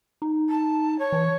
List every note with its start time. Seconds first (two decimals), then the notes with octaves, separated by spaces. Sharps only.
0.22 D#4
0.49 A5
0.99 C#5
1.12 E3